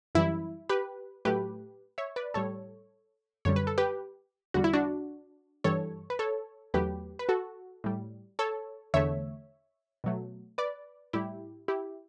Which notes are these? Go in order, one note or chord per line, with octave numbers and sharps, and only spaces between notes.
F#2 E3 G3 E4
G4 B4
A2 F#3 A3 G4 B4
C#5 E5
B4 D5
A2 G3 A4 C#5
F#2 D3 G3 C#5
B4
A4
G4 B4
E2 D3 G3 F#4
E4
D4 F#4
G2 E3 G3 A4 C#5
B4
A4 C#5
E2 D3 F#3 A3 G4 B4
B4
F#4 A4
A2 G3
A4 C#5
E2 D3 A3 C#5 E5
B2 F#3 A3
B4 D5
A2 G3 E4 G4
E4 G4